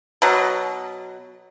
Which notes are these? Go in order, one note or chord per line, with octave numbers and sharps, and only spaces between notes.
B2 F#3